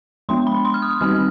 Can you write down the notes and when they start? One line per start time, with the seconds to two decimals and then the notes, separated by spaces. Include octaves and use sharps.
0.29 F3 G#3 B3 D4 C6
0.47 B5
0.65 C6
0.74 F6
0.82 D#6
1.01 D#3 G3 C4 D#4 F6